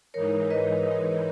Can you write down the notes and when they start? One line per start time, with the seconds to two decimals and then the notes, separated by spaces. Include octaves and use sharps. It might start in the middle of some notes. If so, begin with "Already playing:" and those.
0.14 G#2 E3 G#3 D#4 A#4 C#5
0.50 B4 D#5